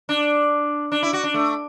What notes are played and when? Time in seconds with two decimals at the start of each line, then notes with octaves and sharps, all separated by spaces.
0.09 D4
0.92 D4
1.03 E4
1.13 F#4
1.24 D4
1.34 A3